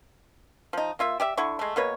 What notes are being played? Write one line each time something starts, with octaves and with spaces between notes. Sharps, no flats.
F3 D#4
A#3 F4 E5
G4 D5 E5
D3 E4 F#5 C#6
G#3 A3
B2 A#3 B4 C#5